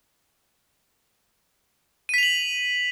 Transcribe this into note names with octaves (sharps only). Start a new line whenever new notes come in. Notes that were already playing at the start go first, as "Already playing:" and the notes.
B6 D#7 F7 F#7